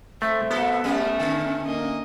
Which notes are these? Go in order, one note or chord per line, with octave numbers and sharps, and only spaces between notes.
A3 C4 E5
A#3 B3 F#4 A4
G3 A3 A#3 C#4
A#2 D3
A#3 D#5